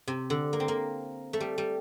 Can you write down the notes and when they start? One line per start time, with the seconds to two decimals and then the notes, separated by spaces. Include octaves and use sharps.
0.07 C3
0.30 D3
0.53 A#3
0.60 C4
0.68 A#3
1.33 A3
1.40 G3
1.58 G3